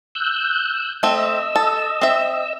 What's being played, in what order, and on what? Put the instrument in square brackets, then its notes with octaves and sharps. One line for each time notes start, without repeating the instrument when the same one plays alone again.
[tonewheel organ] E6 F#6 G6
[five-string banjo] A3 C4 [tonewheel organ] D#5 E6
[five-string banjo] A4
C4 E5